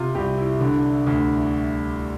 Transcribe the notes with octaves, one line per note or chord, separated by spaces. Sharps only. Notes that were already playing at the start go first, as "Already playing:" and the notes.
Already playing: C3 F4
C2 G4
E4
D3
D2